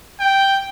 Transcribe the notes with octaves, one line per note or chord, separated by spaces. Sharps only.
G5